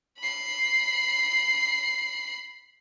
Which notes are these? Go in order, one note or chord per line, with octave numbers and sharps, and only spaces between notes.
B5 C7